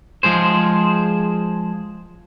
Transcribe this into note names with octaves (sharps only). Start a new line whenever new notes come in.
F3 G#3 G#4 C5